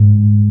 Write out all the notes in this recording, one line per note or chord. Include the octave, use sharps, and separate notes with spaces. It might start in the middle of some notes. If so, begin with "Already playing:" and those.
Already playing: G#2